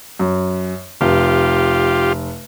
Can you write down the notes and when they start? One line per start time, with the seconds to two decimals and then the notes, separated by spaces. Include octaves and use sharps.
0.20 F#2
1.01 F1 F4 G4